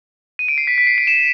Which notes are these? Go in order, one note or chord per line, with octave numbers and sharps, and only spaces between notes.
D#7
D7
C7
B6
B6
C7
D7
E7